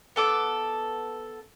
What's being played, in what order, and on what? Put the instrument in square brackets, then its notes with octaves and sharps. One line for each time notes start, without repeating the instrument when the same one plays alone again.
[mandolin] B3 A4 D6